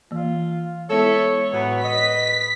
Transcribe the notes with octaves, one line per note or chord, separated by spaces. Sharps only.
E3 A#3 F4
G#3 B3 E4 A4 C#5 E5
A2 E3 F#3 B3
B4 D#5 B6